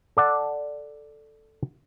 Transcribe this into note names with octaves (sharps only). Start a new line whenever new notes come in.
A4 D5 F#5